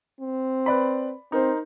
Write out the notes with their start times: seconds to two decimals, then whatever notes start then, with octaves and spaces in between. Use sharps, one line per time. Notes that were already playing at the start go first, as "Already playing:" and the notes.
0.20 C4
0.66 B4 D5 B5
1.32 C4 D#4 A#4 C5